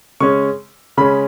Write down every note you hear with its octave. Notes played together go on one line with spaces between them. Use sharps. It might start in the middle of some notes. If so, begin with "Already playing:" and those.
C#3 G#3 C#4 C#6
C#3 G#3 C#4 B5